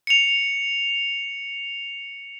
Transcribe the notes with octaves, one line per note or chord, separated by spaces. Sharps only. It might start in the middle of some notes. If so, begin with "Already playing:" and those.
C#7 F7